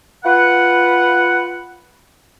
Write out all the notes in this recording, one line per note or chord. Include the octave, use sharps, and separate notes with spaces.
F4 B4 F#5